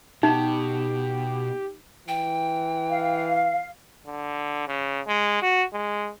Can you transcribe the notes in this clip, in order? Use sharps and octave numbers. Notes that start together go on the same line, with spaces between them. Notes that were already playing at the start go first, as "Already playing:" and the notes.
B2 D#4 G4
E3 G5
F5
D3
C#3
G#3
F#4
G#3